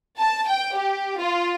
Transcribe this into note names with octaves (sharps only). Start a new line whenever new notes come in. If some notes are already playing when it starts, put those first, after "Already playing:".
A5
G5
G4
F4